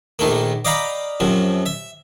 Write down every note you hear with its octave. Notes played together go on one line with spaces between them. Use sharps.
A#1 D#3 A3 A#3
D5 D#5 F5 G5 A#5 B5
F#2 C3 F3
E5